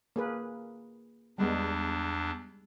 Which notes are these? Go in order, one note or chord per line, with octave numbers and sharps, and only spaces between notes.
A#3 G#4 B4
E2 G3 G#3 B3 D4